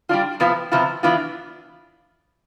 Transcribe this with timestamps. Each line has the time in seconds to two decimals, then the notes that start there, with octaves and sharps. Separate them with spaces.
0.09 G3 D4 F4
0.40 C3 F3 B3 F4
0.72 C3 F3 B3 F4
1.03 E3 B3 D4 F4